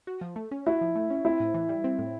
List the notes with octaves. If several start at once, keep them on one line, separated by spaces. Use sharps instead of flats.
F#4
F3
A3
C#4
E4 F#4
F3
A3
C#4
C4 E4
A2
E3
G3
C4
A2